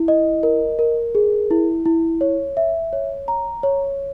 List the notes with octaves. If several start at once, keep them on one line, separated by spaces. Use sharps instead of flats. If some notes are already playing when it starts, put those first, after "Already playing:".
Already playing: E4
D#5
A#4
A#4
G#4
E4
E4
C#5
E5
C#5
A#5
C#5